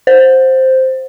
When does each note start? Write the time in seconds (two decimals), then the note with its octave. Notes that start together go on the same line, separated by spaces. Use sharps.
0.07 C5